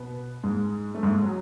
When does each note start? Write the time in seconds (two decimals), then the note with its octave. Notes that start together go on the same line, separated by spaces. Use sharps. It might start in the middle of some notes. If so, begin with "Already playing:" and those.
Already playing: B2 B3
0.43 G#2 G#3
0.95 A3
1.03 G#2 G#3
1.22 F#3